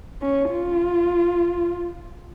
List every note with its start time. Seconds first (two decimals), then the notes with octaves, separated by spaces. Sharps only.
0.22 C#4
0.50 F4